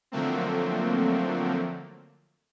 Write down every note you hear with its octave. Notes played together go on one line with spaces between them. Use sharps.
D3 F3 F#3 A3 A#3 C4